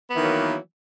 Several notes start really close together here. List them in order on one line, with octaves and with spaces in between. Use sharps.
B3 E3 D#3 F#3 A#3